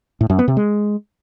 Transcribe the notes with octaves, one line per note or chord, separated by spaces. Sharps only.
A2
F#2
B3
C3
G#3